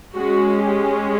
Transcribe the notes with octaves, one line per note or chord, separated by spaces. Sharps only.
G#3 C#4 F#4
G4